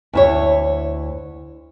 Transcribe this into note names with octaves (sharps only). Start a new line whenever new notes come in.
D2 E4 C#5